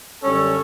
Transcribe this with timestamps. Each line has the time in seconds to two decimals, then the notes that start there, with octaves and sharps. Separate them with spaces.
0.22 F#2 D3 G3 C#4 A4 C#5